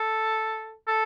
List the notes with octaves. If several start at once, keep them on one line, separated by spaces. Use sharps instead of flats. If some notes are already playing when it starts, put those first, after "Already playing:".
Already playing: A4
A4